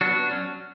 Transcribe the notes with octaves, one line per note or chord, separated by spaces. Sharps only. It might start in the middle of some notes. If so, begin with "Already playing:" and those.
F#3 B3 D4 F#4
F#3 C#4